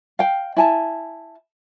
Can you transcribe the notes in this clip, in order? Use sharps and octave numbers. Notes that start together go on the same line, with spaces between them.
F5 G5
E4 G#5 A5